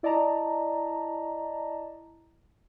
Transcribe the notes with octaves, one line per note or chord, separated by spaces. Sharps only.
E4 D5 D#5 A5 A#5